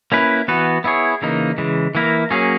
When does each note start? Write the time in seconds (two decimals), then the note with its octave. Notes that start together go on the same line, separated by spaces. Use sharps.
0.12 A#3 C#4 E4 B4
0.48 E3 B3 F#4 B4
0.84 B3 E4 G#4 C#5
1.22 C#3 E3 A#3 D#4
1.58 C#3 E3 G#3
1.95 E3 A#3 E4 A#4
2.31 F#3 A#3 C#4 G#4